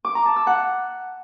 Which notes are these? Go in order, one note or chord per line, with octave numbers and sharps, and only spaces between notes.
D6
A#5
A5
E6
F#5